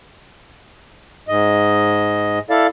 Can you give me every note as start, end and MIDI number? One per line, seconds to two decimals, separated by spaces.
1.28 2.39 44
1.28 2.39 75
2.50 2.67 64
2.50 2.67 69
2.50 2.67 74
2.50 2.67 77